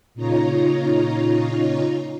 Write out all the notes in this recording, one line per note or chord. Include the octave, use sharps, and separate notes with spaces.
A#2 C#3 D#4 F4 C#5 A#5